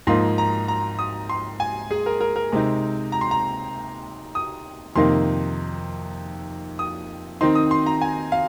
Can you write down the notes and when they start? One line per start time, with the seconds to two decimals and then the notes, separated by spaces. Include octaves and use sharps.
0.07 G#2 F3 A#3 D#4 C6
0.38 A#5
0.68 A#5
0.99 D#6
1.30 C6
1.60 G#5
1.91 G#4
2.06 A#4
2.21 A#4
2.36 A#4
2.52 C3 G#3 C4 D#4
3.12 A#5
3.21 C6
3.31 A#5
4.35 D#6
4.95 F2 C3 D#3 A#3 D#4 C6
6.79 D#6
7.41 D#3 C4 D#4 C6
7.55 D#6
7.71 C6
7.86 A#5
8.02 G#5
8.32 F5